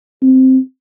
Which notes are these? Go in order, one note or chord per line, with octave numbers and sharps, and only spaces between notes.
C4